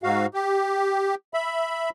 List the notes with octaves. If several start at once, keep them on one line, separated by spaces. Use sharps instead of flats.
G#2 F#4 F5
G4
E5 B5